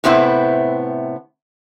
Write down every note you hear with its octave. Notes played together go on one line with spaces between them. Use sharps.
A2 C3 B3 C4 E4